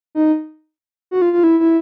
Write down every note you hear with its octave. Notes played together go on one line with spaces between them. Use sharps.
D#4
F#4
F4
F4
E4
E4